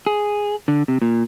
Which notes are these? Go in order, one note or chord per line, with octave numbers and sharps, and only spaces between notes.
G#4
D3
C3
A#2